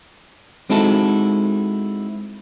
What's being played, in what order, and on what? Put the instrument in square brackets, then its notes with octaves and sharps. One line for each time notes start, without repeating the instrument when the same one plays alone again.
[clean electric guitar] G#3 C4 D#4 E4 F#4 A4